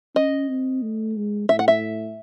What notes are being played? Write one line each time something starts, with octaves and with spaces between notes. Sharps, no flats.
C#4 D#5
C4
A3
G#3
A2 E5
F#5
E5